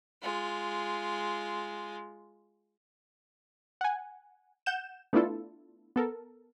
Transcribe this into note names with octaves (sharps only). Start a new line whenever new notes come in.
G#3 F4
F#5 G#5
F#5 G6 E7
A3 B3 D4 E4 F4 A4
B3 A4 A#4